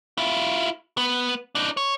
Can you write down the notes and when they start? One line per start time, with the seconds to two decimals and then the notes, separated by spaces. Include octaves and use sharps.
0.18 E4 F4
0.97 B3
1.55 D4 D#4
1.77 C#5